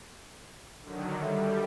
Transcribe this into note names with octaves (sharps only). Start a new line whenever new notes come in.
D3 D#3 F#3
G3 A4 E5